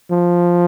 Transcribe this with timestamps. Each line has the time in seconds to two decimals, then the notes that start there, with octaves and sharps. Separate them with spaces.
0.11 F3